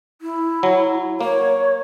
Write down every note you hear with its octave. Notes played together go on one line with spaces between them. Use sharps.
E4
F#3
A#3 C#5